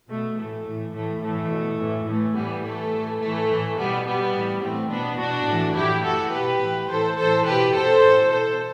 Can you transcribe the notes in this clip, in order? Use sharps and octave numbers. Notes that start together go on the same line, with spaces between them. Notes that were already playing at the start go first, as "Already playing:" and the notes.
B2 A3
A2 E3 A3
A2 E3
A2 E3 A3
A2 E3 A3
B2
A2 E3
A2 E3 A3
A2 E3 G3 B3
A2 E3 A3
A2 E3
A2 E3 A3
A2 E3
B2 G3 B3
B2 G3 B3
A2 E3
A2 E3 A3 C4
B2 B3 D4
B2 D4 F#4
A2 E3
A2 E3 E4 G4
A2 E3 F#4 A4
B2 G4 B4
A2 E3
A2 E3 A4 C5
A2 E3 A4 C5
B2 G4 B4
B2 A4 C5
A2 E3
B2 A4 C5